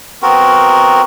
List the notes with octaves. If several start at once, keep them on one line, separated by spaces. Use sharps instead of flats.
B3 C4 F#4 A#4